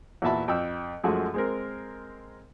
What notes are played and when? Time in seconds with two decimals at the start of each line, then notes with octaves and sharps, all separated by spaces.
0.22 E2 A#2 F#4 E5 A5 B5
0.48 F2 G5 E6
1.04 F#2 F3 G#3 A3 F#4
1.34 G#3 C4 A#4